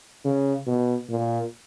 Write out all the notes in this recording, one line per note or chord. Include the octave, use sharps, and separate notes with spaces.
C#3
B2
A#2